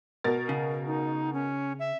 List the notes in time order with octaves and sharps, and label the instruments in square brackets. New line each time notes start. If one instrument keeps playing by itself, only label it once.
[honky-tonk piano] B2 A#4 A6
[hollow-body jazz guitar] C#3
[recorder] D#4
C#4
E5